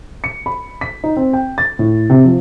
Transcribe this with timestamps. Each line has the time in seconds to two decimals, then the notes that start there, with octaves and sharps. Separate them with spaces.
0.24 C#7
0.46 B5
0.81 B6
1.04 D#4
1.17 C4
1.33 G5
1.58 A6
1.79 A2
2.10 C3
2.25 F3